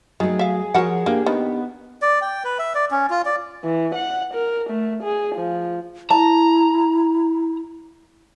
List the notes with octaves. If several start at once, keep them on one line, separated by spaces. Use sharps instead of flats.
D#3 F#3 A3 G#4
E5 F5
F3 F#4 A#4 C#5 F#5
A#3 D4 G4
D#3 B3
D5
G5
B4
E5
D5
C#4
F4
D5
E3
F#5
A#4
A3
G#4
F3
E4 A5 A#5